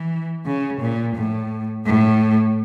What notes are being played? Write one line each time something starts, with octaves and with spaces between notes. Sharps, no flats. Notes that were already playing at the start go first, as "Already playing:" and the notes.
Already playing: E3
C#3
A#2
A2
A2